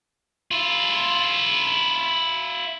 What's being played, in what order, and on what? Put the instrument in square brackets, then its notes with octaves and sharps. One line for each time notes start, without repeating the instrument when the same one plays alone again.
[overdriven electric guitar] E4 F4